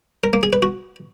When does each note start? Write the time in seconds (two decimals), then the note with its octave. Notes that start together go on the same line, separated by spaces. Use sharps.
0.24 A#4
0.33 A#3
0.43 G#4
0.53 B4
0.62 F#4